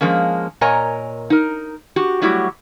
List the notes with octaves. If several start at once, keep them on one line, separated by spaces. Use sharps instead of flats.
F3 G#3 A#3 C#4
A#2 A#4 C#5 D#5 G#5 A#5
D#4 A#4
F#4 G4
F#3 G3 A3 E4 F#4 G4